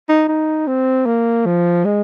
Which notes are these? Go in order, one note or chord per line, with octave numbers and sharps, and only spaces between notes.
D#4
D#4
C4
A#3
F3
G#3